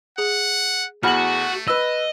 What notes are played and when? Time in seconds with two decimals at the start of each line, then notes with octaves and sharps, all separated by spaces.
0.18 G#4 F#5
1.03 E2 A3 F#4 G#4 F#5 B5 F6 F#7
1.68 B4 D#5 E6